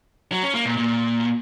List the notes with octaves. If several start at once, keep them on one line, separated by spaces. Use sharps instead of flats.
F#3
C#4
A#3
A#2
A#2